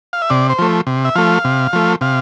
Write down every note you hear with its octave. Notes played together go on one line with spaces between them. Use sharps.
F5
E5
C3 D5
C5
F3 A3
C3
E5
F3 A3 F5
C3
F3 A3
C3 F5